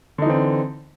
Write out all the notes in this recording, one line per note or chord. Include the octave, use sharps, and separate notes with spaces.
D3 E3 C4 D#4